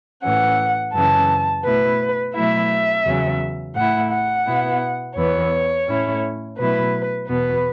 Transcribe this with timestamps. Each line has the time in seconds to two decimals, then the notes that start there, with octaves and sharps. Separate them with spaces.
0.23 A2 E3 C#4 F#5
0.93 F#2 C#3 E3 C#4 A5
1.64 B2 A3 E4 B4
2.34 B2 F#3 A3 E4 E5
3.05 E2 C#3 F#3 C#4
3.76 A2 A3 E4 F#5
4.11 F#5
4.46 B2 B3 E4
5.16 E2 E3 B3 C#5
5.87 A2 A3 C#4 E4
6.57 B2 F#3 A3 E4 B4
7.28 E2 B2 B3 B4